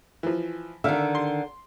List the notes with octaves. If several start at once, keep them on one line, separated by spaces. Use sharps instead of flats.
E3 F3
D3 D#3 E5 F5
C6